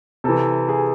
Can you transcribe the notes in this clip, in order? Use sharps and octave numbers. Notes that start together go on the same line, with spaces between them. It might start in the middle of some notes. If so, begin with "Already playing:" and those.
C3 E3 A4
G#4